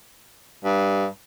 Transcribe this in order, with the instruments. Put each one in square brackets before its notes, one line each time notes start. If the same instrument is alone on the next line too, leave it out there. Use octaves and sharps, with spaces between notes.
[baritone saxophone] G2